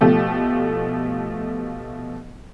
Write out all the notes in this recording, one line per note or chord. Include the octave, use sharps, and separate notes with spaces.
B2 F3 A3 G4